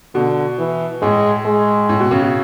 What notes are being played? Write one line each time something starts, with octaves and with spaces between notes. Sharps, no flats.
B2 D3
E3
A2 G#3
G#3
A2
B2
C#3
B2